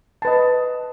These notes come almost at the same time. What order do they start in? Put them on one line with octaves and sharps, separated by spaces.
A5 B4 D#5